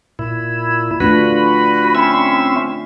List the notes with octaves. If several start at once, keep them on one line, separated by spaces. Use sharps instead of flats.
A#2 E4
A3 D4 F4 F#4 B4 B5
C4 C#4 E5